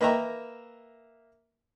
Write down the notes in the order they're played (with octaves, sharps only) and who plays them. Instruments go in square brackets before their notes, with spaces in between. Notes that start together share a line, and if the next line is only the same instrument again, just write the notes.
[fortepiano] A#3 B4 D#5 E5 G5 A#5